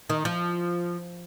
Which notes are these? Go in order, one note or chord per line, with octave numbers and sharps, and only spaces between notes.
D#3
F3